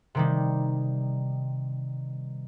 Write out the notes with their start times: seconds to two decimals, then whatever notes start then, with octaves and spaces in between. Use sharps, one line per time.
0.15 C3 D#3 G3